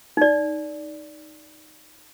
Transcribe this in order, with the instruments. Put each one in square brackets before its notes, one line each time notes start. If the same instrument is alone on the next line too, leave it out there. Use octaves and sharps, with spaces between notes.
[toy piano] D#4 D5